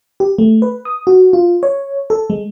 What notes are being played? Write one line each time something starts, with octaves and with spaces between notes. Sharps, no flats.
G4
A3
B4
D#6
F#4
F4
C#5
A4
G#3